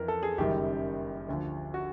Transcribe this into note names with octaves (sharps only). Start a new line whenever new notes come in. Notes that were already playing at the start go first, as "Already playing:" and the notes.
Already playing: F2 E3 A#4
A4
G#4
F#1 F#2 D#3 G3 G4
D2 D3 F3
F#4